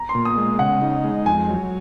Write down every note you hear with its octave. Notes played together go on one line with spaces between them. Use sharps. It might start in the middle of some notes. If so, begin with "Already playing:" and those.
Already playing: A#5
C6
A#2
D#6
G#3
C#3 F#5
D#4
G#3
F2 G#5
F#3